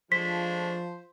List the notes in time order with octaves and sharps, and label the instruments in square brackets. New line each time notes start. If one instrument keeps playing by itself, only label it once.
[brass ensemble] F3 [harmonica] G#3 A3 D4 [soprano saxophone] C5 [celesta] B6